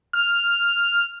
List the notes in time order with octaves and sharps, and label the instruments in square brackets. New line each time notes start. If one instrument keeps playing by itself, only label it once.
[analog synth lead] F6